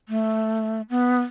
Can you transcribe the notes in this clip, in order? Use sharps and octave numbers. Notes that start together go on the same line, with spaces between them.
A3
B3